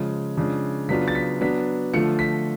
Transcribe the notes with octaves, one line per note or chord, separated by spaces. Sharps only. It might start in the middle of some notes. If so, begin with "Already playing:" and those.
Already playing: C#3 F3 G#3
C#3 F3 G#3 D4
C#3 F#3 B3 D4 F4 B6
A6
B6
F#3 B3 D4 B6
D3 F3 A3 F4 C#7
B6